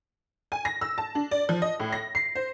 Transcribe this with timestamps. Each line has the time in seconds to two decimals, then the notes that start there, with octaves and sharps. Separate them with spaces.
0.52 G#5
0.65 A#6
0.81 E6
0.98 A5
1.15 D4
1.31 D5
1.49 F3
1.62 D#5
1.80 A2
1.93 A#6
2.15 C7
2.35 C5